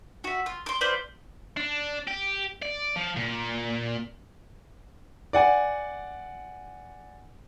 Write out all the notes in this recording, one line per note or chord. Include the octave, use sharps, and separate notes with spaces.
F#4 E5
F4
C6 D6
F4 B4 C5 D5
D4
G4
D5
F3
A#2
D5 F#5 G#5